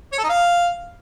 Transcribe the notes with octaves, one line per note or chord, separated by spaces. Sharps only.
C#5
A4
D#4
F5